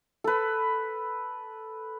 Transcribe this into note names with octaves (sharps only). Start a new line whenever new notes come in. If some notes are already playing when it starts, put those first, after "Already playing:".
A4 B4